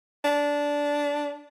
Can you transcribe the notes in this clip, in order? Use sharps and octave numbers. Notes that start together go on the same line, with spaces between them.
D4